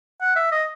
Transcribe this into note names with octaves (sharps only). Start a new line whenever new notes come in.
F#5
E5
D#5